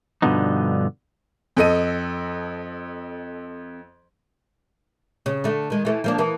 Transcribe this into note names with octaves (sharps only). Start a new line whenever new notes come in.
G2 B2 D3 F3 B3 D#4
F2 A4 D#5 D#7
C#3
D3 A3
D#3 G#3
E3 A3
F3 A#3 D4
E3 A#3